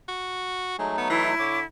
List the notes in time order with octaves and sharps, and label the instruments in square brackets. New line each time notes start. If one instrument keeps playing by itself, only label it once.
[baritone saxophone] F#4
[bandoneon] F#3 A3 D#4 [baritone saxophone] G#3
[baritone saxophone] B3
[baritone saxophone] E3 [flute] E4
[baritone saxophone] D3 [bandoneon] C#5 D6